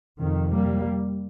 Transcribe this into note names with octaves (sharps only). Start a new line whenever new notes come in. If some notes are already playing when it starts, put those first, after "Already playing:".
F2 C3 D#3
G3 A#3